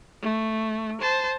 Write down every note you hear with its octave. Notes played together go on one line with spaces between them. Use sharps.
A3
C5 A5